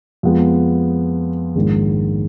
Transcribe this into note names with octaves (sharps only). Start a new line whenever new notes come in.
F2 F3 G#3 B3
A#1 G#2 D#3 G#3 D4